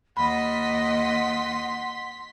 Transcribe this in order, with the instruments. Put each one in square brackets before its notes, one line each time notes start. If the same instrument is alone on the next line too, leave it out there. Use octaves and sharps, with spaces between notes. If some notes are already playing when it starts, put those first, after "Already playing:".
[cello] D#2 D#5 [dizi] F#5 [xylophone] B5 [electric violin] C6 B6